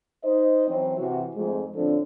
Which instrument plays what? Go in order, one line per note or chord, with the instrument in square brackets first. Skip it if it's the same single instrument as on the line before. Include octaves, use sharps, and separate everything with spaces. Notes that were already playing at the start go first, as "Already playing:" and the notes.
[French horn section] D#4 C5 D#5
E3 F#3 C4
C3 E3 E4 F#4
F2 G#2 A3
A2 D3 F3 C4 D4 A4